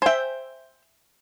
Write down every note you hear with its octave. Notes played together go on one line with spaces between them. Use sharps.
C5 E5 G5 G#5